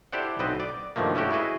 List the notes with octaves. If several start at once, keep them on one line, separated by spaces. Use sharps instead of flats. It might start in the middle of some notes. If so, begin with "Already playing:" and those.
E4 G4 A4 C5 D5 F#5
B1 B3 C4 B4 C5 D#5
D5
G2 B2 D#3 F3 A3 A#3
A3 C#4 E4 F#4 G4
E4 F#4 G#4 B4 D#5